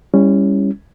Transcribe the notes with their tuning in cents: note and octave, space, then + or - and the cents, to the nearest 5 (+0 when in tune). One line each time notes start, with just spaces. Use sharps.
G3 +30 C#4 -5 E4 +0